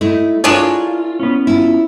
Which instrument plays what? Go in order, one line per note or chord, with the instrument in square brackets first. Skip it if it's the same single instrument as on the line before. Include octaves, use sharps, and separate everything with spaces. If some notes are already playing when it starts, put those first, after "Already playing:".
[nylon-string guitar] A3 D#4 E4
[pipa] D4 G#4 C#5 [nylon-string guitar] E4 A#4 [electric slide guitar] F4
[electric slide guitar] B3 C#4
[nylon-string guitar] E4 F4